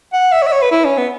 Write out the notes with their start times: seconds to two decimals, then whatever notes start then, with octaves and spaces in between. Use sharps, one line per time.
0.13 F#5
0.32 E5
0.42 C#5
0.47 E5
0.52 C#5
0.62 B4
0.72 E4
0.85 C#4
0.98 B3